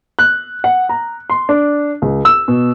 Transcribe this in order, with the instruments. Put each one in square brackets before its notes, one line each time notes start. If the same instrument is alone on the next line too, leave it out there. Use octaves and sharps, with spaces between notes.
[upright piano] F#6
F#5
A#5
C6
D4
C#2
E6
B2